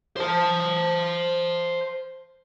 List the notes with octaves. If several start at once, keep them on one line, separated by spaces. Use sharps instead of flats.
C5 A5